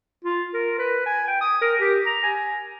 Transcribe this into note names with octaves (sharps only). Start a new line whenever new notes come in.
F4
A#4
B4
G#5
G5
D#6
A#4
G4
A#5
G#5